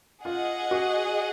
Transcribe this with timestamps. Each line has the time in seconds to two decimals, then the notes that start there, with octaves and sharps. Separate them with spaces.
0.25 F4 G#4 D#5 F#5
0.71 F#4